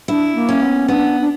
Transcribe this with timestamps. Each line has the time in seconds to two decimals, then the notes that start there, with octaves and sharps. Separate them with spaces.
0.08 D4 E4
0.35 A#3
0.49 C#4
0.61 B3
0.88 B3 D4
1.21 D4